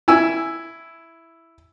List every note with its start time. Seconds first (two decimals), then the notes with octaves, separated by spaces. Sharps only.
0.08 E4 G#5 E6